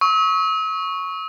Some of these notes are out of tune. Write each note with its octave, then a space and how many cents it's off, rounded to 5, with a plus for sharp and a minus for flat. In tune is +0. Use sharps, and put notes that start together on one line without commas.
C#6 +0 E6 -45